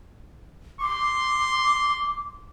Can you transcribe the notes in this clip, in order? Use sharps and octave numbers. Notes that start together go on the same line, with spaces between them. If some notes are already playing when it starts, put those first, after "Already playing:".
C6 D6